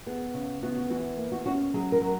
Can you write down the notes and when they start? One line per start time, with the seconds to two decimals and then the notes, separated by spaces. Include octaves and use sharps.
0.06 B3 G#4
0.34 C#3
0.62 B3 F#4
0.77 F#4
0.90 E3 F#4
1.17 A#3
1.32 F#4
1.46 C#4 F#4
1.74 F#3 G#4
1.92 A#4
2.01 F#3